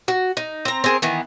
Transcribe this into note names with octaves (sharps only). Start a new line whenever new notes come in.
F#4
D#4
C4 A#5
C4 G#4 A#4
D#3 E3 B3